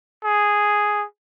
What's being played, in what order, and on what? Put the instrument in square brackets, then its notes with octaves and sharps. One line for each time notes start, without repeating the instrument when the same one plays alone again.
[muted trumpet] G#4